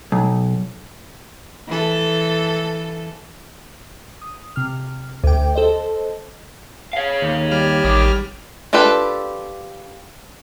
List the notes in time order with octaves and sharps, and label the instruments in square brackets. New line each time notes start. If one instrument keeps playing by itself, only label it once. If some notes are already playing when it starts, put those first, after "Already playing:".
[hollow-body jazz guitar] B1
[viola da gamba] E3 A4
[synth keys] D#6
C3 F6
D2 G5
A4 C5 D#5
[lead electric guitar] C#5 F5
[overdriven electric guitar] D#2
[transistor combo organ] G3 F6
[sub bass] A1 [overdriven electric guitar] D#3 G4
[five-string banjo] D4 F4 G4 A4 B4